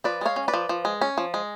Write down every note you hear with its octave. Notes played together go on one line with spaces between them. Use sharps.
F3 B4 D5
G#3 C#5 F5
C#4
B4 D5
F3
F3
G#3
C#4
F3
G#3